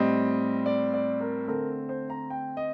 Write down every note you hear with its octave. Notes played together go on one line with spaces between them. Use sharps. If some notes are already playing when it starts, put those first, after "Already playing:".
Already playing: A2 G3 C4 D#5
D5
D5
A#4
D3 A3 C4 A#4
C5
A#5
G5
D#5